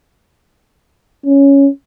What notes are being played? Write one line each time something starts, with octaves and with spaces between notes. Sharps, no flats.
C#4